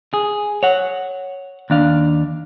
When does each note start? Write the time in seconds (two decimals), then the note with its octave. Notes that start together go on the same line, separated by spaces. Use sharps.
0.14 G#4
0.63 C#5 F#5
1.70 D#2 D4 F5